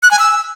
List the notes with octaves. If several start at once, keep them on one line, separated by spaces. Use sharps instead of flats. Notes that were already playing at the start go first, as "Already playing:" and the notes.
F#6
G#5
E6